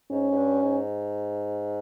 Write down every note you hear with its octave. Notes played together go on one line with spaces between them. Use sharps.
G#2 C#4
G#2
G2
G#2